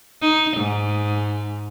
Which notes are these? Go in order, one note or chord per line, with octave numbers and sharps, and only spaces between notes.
D#4
G#2